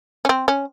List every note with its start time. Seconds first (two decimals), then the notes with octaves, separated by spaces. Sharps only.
0.25 C#4
0.29 C4
0.48 C#4